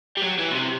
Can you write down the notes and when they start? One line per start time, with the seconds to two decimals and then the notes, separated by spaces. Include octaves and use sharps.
0.17 G3
0.22 F#3
0.39 E3
0.51 B2
0.55 C3